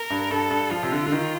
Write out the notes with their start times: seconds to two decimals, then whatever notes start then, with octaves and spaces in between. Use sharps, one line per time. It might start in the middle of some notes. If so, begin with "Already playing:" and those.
Already playing: A#4
0.10 G2
0.31 G2 A4
0.51 G2
0.71 F3 F4
0.83 C3
0.92 D3
1.06 D3
1.12 D#3